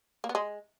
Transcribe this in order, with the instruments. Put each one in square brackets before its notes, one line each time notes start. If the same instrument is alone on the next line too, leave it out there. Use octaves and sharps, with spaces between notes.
[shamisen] A#3
B3
G#3